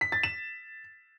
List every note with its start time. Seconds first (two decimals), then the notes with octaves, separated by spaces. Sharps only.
0.01 B6
0.12 A6
0.23 E7